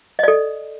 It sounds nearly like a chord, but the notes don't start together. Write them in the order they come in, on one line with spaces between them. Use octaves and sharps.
D#5 D5 A4